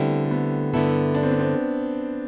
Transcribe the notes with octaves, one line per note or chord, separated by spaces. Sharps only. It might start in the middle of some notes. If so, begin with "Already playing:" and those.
Already playing: D3 G3 A3 B3 C4 E4
A3
B3
G2 D3 A3 B3 E4 A4
D4
C4
B3
C4